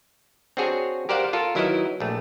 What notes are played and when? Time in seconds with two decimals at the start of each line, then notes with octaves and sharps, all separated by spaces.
0.57 C4 D4 F#4 G#4 C#5
1.09 G4 A#4 C5 D5 F5 F#5
1.33 F4 A4 A#4
1.55 D#3 F#3 E4 A#4 B4 D#5
2.00 A#1 A3